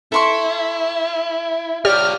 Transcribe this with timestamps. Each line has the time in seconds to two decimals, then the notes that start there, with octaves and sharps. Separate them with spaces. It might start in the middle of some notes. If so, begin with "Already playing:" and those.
0.12 E4 A4 C6 C#6
1.85 F4 G4 C#5 D5 F6